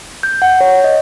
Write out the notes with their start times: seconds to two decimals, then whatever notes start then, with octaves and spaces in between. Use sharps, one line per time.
0.23 G6
0.42 F#5
0.61 C#5
0.84 D#5